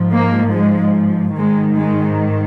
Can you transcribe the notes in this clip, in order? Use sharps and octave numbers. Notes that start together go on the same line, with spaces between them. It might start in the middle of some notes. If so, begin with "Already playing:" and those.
Already playing: G#2 F3
A#3
G#3
G#2 D#3 G#3
G#3